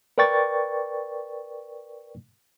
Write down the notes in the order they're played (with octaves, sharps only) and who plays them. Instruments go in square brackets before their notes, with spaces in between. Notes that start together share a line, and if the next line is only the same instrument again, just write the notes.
[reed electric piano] A#4 B4 D5 G5 C#6 A6